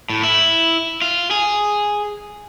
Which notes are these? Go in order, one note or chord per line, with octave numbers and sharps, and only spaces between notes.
A2
E4
F4
G#4